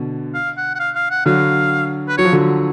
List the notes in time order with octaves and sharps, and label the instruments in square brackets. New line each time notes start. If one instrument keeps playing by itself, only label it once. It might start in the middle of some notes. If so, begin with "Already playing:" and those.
Already playing: [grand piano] B2 D3
[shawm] F5
F#5
F#5
F5
F5
F#5
[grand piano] D3 F#3 [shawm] F5
[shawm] B4
[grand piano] F#3 [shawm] C#5
[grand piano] F3
D3 F#3